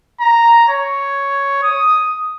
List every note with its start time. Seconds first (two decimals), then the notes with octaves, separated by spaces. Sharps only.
0.21 A#5
0.69 C#5
1.63 D#6